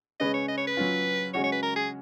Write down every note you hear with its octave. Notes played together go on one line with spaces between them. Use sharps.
C#3 G#3 C#4 G#4 B4 D#5
C#5
D#5
C#5
B4
F#3 C#4 F4
C#3 G#3 C#4 F#4 C#5
C#5
B4
A#4
G#4